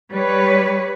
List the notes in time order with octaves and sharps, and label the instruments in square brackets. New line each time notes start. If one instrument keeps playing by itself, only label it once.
[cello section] G3 B4 C#5